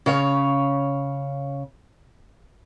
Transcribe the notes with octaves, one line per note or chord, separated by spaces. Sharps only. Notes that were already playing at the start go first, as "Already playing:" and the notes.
C#3 C#5 F5